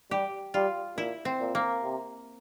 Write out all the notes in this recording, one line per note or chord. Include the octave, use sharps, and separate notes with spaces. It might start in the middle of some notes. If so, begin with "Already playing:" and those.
G3 G4
G3 F4
A#2 E4
C4
A#2
A#3
C3